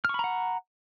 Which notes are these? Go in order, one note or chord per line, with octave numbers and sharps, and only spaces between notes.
F#5 A#5 B5 C#6 F6